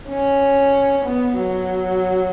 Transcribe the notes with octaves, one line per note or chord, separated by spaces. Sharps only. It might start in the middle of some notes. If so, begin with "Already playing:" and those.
C#4
B3
F#3